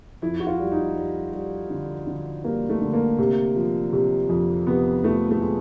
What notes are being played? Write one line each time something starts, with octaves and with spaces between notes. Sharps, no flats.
F2 E4
F#4
F4
G3
D#4
G3
G3
D3
D3
G3 A#3
A3
D3
A#3
C3
F3
C3
F2
C3 B3
F2 A3
A3
G#3